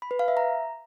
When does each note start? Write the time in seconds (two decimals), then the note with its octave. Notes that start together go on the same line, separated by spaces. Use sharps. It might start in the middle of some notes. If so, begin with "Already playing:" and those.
0.02 B5
0.11 B4
0.19 F5
0.28 E5
0.37 A#5